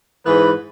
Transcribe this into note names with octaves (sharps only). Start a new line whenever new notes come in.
G#2 E3 B4